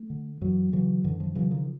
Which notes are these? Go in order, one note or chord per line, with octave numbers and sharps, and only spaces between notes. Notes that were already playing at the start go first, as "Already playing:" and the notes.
Already playing: A3
D3
F#2 E3 F#3
C#3 E3 F#3
F#2 D3 E3
D#3 F3
C#3 E3 F#3
D#3 F3